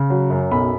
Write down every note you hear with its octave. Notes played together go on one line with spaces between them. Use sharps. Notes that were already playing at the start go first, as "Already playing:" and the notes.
Already playing: C#3
F#3
F#2
B1 B5